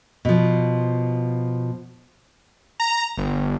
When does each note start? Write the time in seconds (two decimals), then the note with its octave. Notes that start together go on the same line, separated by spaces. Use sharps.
0.25 B2 F3
2.80 A#5
3.18 G1